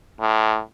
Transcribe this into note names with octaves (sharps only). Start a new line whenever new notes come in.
A2